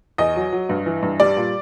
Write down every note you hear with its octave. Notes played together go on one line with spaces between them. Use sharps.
E2 D#5
F#3
F#3
G2
E3
G2
G3 D5
A#2